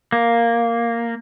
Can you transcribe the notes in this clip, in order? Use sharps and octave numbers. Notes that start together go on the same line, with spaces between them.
A#3